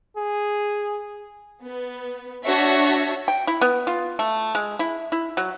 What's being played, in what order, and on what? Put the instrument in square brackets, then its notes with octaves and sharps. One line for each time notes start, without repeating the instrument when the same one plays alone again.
[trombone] G#4
[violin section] B3
D4 F#4 C#5 E5
[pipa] G5
E4
B3
F4
A3
G#3
E4
E4
F#3